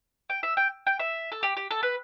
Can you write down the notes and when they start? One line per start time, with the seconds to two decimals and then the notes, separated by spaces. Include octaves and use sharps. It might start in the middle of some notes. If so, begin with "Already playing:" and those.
0.30 G5
0.43 E5
0.57 G5
0.87 G5
1.00 E5
1.32 A4
1.43 G4
1.57 G4
1.71 A4
1.83 B4